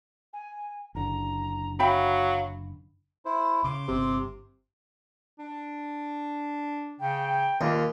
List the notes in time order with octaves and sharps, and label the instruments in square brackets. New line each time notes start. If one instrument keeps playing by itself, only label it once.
[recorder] G#5
[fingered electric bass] F#1 D3 [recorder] A#5
[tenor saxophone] F#3 [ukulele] E5 G5 B5 [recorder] F5
[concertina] E4 C5
[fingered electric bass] C#3 [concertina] C6 D6
[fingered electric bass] G1 [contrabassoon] C3
[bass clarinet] D4
[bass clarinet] C#3 [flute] G5
[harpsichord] D#2 [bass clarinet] F4